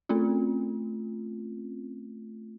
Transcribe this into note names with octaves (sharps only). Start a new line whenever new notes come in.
A3 C4 C#4 F4